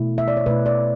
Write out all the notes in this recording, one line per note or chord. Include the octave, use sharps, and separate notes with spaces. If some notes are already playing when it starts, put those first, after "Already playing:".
Already playing: B2 A3 E4
E5
D5
C#5
B2 A3 E4 B4
D5